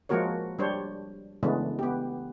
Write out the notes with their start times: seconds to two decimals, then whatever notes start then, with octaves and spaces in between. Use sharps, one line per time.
0.09 F3 G#3 A#3 F#4 A#4 C#5
0.59 G3 D4 C5 C#5
1.43 C#3 E3 G#3 A3 B3 D4
1.79 B3 G4